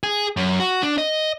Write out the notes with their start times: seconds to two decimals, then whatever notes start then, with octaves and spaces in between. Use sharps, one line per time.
0.03 G#4
0.37 F#2
0.60 F#4
0.83 D4
0.98 D#5